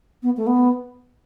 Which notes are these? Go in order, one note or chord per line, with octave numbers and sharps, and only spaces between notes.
B3
A3
B3